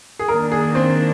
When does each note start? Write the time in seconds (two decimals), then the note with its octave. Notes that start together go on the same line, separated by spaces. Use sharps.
0.19 G#4
0.28 D#3 A#3 D4 A#4
0.52 G#4
0.75 C4